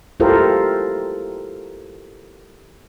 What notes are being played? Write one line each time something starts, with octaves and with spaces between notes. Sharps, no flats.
E4 F4 G4 A4 A#4 C5